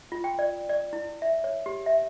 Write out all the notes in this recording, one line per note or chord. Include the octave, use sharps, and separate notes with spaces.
F4
G5
D5
D5
E4
E5
C#5
G4
E5